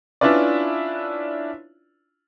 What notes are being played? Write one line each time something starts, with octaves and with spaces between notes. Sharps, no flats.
C#4 D4 E4 F4 B4 D5